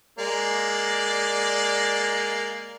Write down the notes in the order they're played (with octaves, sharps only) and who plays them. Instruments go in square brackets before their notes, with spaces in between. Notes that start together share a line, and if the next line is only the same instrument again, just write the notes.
[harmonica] G#3 A#3 D5